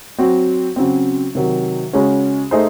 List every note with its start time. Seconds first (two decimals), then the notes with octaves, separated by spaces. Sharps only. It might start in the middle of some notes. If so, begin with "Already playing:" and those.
0.18 F#3 C4 F#4
0.76 C#3 F#3 C4
1.35 C3 D#3 F#3
1.93 C#3 G#3 C#4 F#4
2.51 A3 D#4 G#4 C5